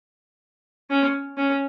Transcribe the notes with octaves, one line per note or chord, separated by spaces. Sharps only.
C#4
C#4